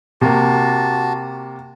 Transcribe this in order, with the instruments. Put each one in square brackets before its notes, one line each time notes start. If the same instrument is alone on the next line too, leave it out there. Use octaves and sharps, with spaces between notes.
[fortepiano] C3 A#3 [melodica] F#4 A5